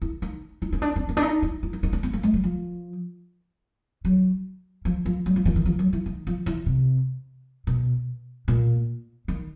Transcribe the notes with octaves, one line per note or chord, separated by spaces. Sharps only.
E4
D#4
D#4
C#4
D4
C4
B3
D4
D#4
E4
E4
D#4
D#4
D4
B3
A#3
G#3
G3
F3
F#3
F3
F3
F#3
F3
E3
D#3
F3
F#3
E3
D#3
F3
E3
C3
B2
A#2
D#3